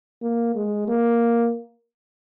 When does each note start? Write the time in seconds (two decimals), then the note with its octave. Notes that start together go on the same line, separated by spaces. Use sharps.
0.22 A#3
0.56 G#3
0.88 A#3